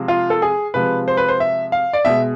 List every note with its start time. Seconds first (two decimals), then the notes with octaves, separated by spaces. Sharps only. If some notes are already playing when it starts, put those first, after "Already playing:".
Already playing: C3 F3 G#3
0.08 F4
0.30 A4
0.42 G#4
0.74 C3 F3 G#3 B4
1.08 C5
1.17 B4
1.28 C5
1.40 E5
1.72 F5
1.93 D5
2.05 B2 G#3 E5